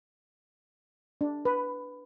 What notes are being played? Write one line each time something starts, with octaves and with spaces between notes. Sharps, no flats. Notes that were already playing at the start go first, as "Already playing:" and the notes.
D4
B4